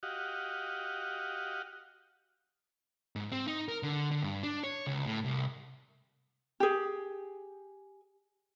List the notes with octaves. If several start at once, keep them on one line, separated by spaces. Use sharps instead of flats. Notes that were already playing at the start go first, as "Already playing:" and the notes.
F#4 G4 D#5 F5 F#5
G#2
C4
D#4
A#4
D3
D3
G2
D4
C#5
C#2
A2
C2
G4 G#4